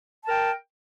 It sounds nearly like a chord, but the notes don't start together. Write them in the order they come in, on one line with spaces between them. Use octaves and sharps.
A5 A#4 G5